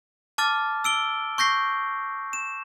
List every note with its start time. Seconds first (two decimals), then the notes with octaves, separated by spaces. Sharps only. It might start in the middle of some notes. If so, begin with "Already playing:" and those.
0.38 A5 D6 F6 A6
0.84 E6 D7 G7
1.38 C#6 G6 A#6 C7
2.33 E7